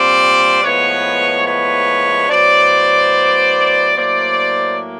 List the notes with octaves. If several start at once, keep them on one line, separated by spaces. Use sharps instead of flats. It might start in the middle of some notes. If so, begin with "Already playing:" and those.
Already playing: A#2 G3 C4 C5 D5
A2 F3 G#3 B3 B4 C#5
B4 C#5
A2 F#3 B3 C5 D5
A2 F#3 A#3 C5 D5